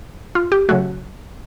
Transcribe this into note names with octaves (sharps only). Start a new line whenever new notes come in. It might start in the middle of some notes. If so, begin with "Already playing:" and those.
F4
G4
C#3 F#3 A3 F#4